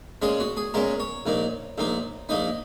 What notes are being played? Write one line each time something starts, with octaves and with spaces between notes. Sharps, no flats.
A#2 G#3 C#4 G#4
F#4
G#4
A#2 G#3 C#4 A#4
C#5
A#1 A#2 A#3 D#4
A#1 A#2 A#3 D#4
A#1 A#2 A#3 D#4 D#5